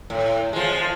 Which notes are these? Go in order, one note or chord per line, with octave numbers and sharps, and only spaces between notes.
A2
F3 G#3